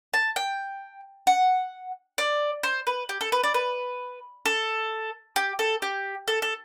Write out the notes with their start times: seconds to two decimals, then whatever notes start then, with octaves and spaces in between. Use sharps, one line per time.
0.14 A5
0.36 G5
1.27 F#5
2.18 D5
2.63 C5
2.87 B4
3.09 G4
3.21 A4
3.32 B4
3.44 D5
3.54 B4
4.46 A4
5.36 G4
5.59 A4
5.82 G4
6.28 A4
6.42 A4